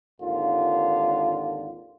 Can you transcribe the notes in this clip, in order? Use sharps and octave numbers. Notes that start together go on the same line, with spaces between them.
G#1 D#2 D3 F4